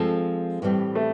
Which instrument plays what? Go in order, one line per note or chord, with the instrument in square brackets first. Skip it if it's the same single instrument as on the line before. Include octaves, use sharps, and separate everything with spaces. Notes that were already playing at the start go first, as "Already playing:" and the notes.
Already playing: [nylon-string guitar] F3 G#3 C4 F4 A4
A2 E3 G3 C4
[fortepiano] A3